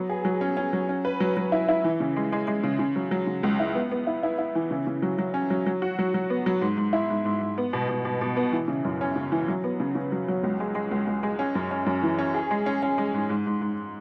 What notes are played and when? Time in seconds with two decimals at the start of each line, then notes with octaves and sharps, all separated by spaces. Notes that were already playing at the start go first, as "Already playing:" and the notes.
Already playing: F#3 B3
0.09 G#4
0.25 F#3
0.41 C#4
0.57 C#4
0.73 F#3
0.89 C#4
1.05 B4
1.20 F#3
1.37 F#3
1.52 E4
1.68 E4
1.84 E3
2.00 C#3
2.16 G#3
2.32 G#3
2.47 G#3
2.64 C#3
2.79 C#3
2.96 F#3
3.11 F#3
3.27 C#3
3.43 C#2
3.60 E4
3.75 B3
3.91 B3
4.07 E4
4.23 E4
4.38 E4
4.55 E3
4.71 C#3
4.87 C#3
5.02 F#3
5.18 F#3
5.34 C#4
5.50 F#3
5.66 F#3
5.82 F#4
5.99 F#3
6.14 F#3
6.30 B3
6.46 F#3
6.61 G#2
6.77 G#2
6.93 E4
7.10 G#2
7.25 G#2
7.42 G#2
7.58 B3
7.73 B2
7.89 B2
8.05 B2
8.21 B2
8.37 B3
8.53 E3
8.68 C#3
8.85 F#2
9.01 C#4
9.16 C#3
9.32 E3
9.48 F#3
9.64 B3
9.80 C#3
9.95 C#3
10.12 F#3
10.28 F#3
10.43 C#2
10.60 G#3
10.75 G#3
10.91 C#2
11.07 C#2
11.23 G#3
11.39 C#4
11.55 F#2
11.71 C#4
11.86 F#2
12.03 E3
12.18 C#4
12.34 G#4
12.51 G#3
12.66 C#4
12.82 C#4
12.98 G#3
13.14 G#2
13.30 G#2
13.47 G#2
13.61 G#2